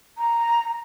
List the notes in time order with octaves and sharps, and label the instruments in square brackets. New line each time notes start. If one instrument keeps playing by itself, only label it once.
[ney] A#5